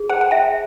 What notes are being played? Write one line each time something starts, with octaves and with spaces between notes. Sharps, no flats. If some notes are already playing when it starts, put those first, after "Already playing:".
Already playing: G#4
C5 F#5
F#5
E5 G5